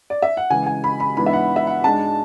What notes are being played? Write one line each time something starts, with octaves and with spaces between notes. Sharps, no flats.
D5
E5
F#5
C#3 E3 G#3 G#5
G#5
B5
B5
G#2 E3 B3 D4 B5
E5
F#5
E5
F#5
G#2 G#3 D4 A5